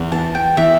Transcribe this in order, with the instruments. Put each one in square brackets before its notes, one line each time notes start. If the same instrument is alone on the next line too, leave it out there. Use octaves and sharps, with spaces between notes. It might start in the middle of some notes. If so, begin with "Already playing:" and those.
Already playing: [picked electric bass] E2
[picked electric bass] E3 [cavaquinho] A5
[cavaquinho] G5
[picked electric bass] E3 [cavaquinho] E5